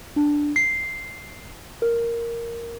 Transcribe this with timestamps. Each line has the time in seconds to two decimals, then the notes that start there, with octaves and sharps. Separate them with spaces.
0.16 D4
0.56 C7
1.82 A#4